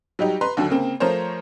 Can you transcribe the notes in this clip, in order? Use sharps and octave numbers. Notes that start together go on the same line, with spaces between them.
F#3 G3 D#4 G4
B4 A#5 C6
D#2 D3 F#3
C#3 A#3 C4
F3 A3 A#4 C5 C#5